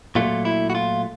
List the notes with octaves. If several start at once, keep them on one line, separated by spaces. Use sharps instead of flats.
A#2 F#3 A3 F4
E4
F#4
F4